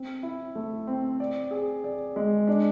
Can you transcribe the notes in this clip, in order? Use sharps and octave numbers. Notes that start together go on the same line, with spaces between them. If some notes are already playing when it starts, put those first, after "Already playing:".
Already playing: C4
E4
A3
C4
D5
G#4
D5
G#3
D4